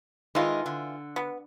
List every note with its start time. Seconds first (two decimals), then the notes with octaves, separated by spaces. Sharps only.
0.35 D#3 E3 G#3 D#4 F4
0.66 D3
1.16 B3